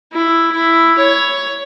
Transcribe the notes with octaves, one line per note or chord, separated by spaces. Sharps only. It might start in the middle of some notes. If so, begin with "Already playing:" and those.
E4
E4
C#5